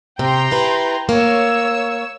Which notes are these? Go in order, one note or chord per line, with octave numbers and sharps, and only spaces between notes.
C3 G5 A#5 C6
E4 B4
A#3 C#5 E6